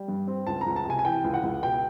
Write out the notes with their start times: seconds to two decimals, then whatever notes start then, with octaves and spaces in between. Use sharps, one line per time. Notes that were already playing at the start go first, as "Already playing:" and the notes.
Already playing: G3
0.08 G2
0.27 C4
0.47 C#2 A5
0.61 C#2 A#5
0.76 A5
0.85 C3 G#5
0.99 G#5
1.05 E3 G5
1.24 C#2
1.34 F#5
1.43 C#2
1.63 B2 G5